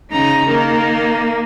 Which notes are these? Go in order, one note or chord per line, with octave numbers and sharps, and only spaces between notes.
C#3 D#4 A#5
D#3 A#3